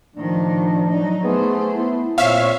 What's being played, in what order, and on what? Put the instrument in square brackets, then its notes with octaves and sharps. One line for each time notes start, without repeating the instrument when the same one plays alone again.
[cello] A2 D#3 [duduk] F3 [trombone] D4
[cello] F#3 D#4
[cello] A3 C5 [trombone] B3 [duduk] G#4
[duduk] B3 [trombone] E4
[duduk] A#2 [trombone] C4 [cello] C#5 [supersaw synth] E5 F5